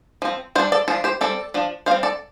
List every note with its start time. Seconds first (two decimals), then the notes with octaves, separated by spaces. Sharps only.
0.22 F3 C4
0.55 G3 C5 F5
0.60 D4
0.72 A4 D5
0.88 F3 F4 A4
0.91 D4
1.04 G4 C5
1.21 G3 C4 A4 D5
1.54 F3 D4
1.86 G3 C5 F5
1.91 C4
2.03 A4 D5